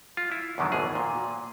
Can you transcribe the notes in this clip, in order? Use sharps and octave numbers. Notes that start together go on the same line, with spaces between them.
F4
E4
E2 B2 D3 D#3 F#3
G#1 E2 B2 G#4
A#2